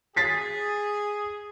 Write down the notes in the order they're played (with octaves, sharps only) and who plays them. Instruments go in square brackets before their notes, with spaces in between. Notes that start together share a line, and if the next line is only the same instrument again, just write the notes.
[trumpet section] G#4 [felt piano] A6 B6 C7